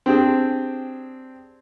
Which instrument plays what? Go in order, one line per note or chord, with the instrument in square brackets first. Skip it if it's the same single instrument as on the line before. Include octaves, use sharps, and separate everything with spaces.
[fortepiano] C4 D4 G4 G#4